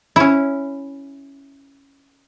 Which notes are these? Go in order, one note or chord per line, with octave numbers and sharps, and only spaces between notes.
C#4 E4